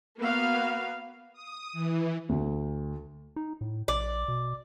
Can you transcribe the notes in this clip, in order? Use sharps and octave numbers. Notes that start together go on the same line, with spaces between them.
A#3 B3 F#4 B4 F5
D#6
E3
D2
D#4
A2
A#1 D5
B2